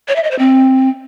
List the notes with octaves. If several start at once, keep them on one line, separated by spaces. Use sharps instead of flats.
C#5
E5
D#5
C5
C4